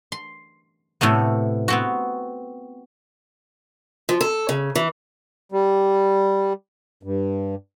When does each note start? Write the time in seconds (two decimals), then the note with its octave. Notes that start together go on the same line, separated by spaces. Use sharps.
0.12 C6
1.01 A2 C3 A3 B3
1.68 B3 C4 F#4
4.09 F3
4.21 A4
4.49 C#3
4.75 E3
5.52 G3
7.03 G2